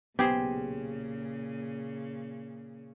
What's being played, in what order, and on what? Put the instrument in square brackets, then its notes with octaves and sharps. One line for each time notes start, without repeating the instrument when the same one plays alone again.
[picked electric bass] B1 B3 [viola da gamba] A#2 C#3 [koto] G4 G#4 C5